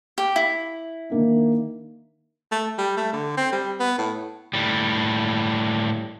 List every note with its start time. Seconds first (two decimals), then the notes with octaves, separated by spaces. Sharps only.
0.18 G4
0.36 E4
1.10 D#3 A#3 D4
2.52 A3
2.78 G3
2.97 A3
3.13 D3
3.37 C4
3.52 G3
3.80 B3
3.98 A2
4.53 A2 G3